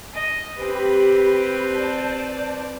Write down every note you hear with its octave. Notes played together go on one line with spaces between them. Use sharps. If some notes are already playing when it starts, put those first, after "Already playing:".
D#5
C4 G4 B4 B5
D5 A5 G6